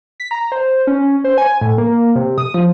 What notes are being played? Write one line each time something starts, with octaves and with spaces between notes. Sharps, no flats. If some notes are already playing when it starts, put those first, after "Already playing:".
B6
A#5
C5
C#4
C5
G#5
A2
A#3
C3
D#6
F3